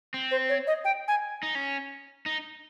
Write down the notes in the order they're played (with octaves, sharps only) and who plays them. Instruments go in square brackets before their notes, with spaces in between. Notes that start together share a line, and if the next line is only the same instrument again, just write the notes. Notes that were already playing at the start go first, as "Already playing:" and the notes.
[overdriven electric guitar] C4
[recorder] C5
C#5
D#5
G5
G#5
[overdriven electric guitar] D#4
C#4
D#4